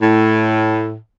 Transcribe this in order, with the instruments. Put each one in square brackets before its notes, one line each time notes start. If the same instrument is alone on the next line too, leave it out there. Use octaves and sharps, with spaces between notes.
[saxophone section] A2